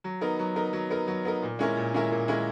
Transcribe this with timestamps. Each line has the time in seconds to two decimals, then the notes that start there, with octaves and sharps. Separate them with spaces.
0.04 F#3
0.21 B3 D#4 A#4
0.39 F#3
0.56 B3 D#4 A#4
0.73 F#3
0.90 B3 D#4 A#4
1.07 F#3
1.25 B3 D#4 A#4
1.42 A#2
1.59 G#3 C#4 E4 A#4
1.77 A#2
1.94 G#3 C#4 E4 A#4
2.11 A#2
2.28 G#3 C#4 E4 A#4